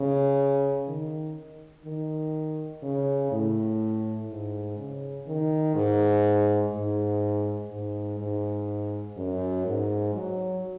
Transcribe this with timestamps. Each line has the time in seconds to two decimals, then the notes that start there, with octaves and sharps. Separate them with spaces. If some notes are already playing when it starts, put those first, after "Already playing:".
Already playing: C#3
0.88 D#3
1.86 D#3
2.83 C#3
3.31 A2
4.30 G#2
4.78 C#3
5.27 D#3
5.76 G#2
6.73 G#2
7.71 G#2
8.19 G#2
9.17 F#2
9.66 G#2
10.15 F#3